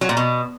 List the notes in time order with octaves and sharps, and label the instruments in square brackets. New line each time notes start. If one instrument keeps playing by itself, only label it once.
[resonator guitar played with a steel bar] F#3
A#2
B2